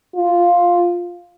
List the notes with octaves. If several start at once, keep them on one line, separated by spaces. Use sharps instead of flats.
F4